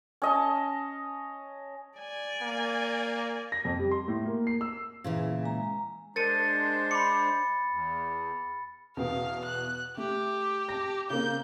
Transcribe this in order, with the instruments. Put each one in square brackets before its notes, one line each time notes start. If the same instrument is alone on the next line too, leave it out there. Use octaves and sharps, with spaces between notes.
[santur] C#4 D#5 A5
[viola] D5 G#5
[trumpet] A#3
[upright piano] A#6
F2
G3
C6
A2
A#3
C7
E6
[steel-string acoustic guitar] A#2 C#3 E3 [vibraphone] G#4
[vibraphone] G#3 G#5 A#5
[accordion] G#3 D4 C5 [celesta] A#4 C#7 D#7 [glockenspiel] A6
[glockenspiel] B5 C#7 [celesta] C6 D6
[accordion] E2
[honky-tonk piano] E2 B2 [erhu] F5
[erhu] F#6
[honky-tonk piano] A3 [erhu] G4
[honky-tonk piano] A5 A#6
[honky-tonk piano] C#3 A#3 C4 [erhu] G6